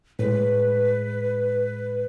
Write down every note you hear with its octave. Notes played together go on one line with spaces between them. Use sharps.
A2 G#3 B4